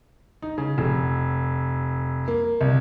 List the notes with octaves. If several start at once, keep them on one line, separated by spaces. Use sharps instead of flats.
D#4
C#3
F1
A#3
C2